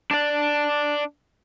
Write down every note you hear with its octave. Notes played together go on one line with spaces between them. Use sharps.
D4 D5